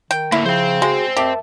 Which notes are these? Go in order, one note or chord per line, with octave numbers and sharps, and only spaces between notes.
D#3 G5
A2 D3 A#3 E4
C#3 F3 G#4 C5 G5
G#3 F#4 G#4
F2 G4 A#4 E5 A5